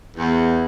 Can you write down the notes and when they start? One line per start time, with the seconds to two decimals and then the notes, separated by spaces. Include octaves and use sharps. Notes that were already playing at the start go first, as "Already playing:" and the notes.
0.17 E2